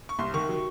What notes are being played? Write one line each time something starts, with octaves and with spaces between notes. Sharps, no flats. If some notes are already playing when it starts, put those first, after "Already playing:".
C#6
C2 C6
D#3 C#6
F#3